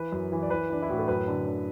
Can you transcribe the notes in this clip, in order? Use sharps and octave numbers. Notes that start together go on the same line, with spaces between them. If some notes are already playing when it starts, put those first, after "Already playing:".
Already playing: E3 B4
F#2
E3
D5
E3 B4
E3 D4
E4
A2 F#4
A4
F#2 B4
D3
D3